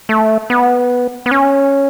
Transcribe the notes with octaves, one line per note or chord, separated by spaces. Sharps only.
A3
B3
B3
C#4